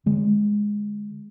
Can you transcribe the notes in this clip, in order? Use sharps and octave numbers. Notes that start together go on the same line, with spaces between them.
D3 G#3